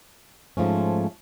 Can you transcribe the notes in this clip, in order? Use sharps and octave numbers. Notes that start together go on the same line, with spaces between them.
G#2 F3 A3 C#4